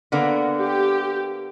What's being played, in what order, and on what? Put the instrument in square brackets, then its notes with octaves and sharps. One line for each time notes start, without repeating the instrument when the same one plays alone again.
[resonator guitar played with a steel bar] D3 A#3 B3
[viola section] G4